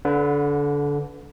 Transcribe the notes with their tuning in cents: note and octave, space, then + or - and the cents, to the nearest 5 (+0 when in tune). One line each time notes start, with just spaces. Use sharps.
D3 -25 B4 +0 F#5 -20